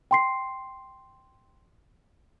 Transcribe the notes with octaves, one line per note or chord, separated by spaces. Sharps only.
G5 C6 C7